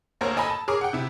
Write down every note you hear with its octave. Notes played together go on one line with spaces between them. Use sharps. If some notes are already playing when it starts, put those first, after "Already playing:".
D2 A#3 A#4 C5 C#5
A4 D#5 G#5 A#5 B5
A5
G#4 A#4 C#5 A#5 D6
F#5 G5
C3 E4